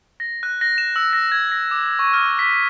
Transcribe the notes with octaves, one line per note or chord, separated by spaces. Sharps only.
A#6
F#6
A#6
E7
E6
A#6
G#6
A#6
D6
C#6
F6
B6